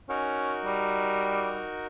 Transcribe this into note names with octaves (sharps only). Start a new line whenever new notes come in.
C#4 D#4 F#4 A#4
G3